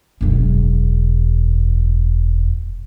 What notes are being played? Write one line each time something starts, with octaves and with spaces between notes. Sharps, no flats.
E1 F#2